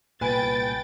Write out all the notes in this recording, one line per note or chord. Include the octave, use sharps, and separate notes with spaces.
C2 A#2 B4 G5 G#5 A6 D7